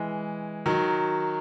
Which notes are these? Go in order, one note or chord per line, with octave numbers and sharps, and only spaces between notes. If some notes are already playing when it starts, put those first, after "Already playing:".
Already playing: E3 G#3
D#3 F#3